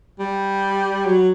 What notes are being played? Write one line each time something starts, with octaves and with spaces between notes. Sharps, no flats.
G3
F#3